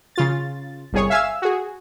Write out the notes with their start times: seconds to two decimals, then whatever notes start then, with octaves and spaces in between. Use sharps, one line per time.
0.16 C#3 F4 A6
0.93 G1 C2 G#4 C#5
1.10 E5 F5 G#5 E6
1.42 F#4 G#4